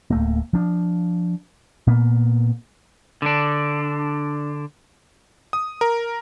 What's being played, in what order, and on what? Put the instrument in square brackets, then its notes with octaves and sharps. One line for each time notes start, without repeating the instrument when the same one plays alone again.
[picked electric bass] D1 A3 A#3
F3 D4
A#2 A#3 B3
[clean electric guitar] D3 D4
[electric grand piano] D#6
A#4